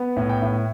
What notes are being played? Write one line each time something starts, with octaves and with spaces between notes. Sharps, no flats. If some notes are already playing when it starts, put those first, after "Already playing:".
Already playing: B3
A2
G5
A2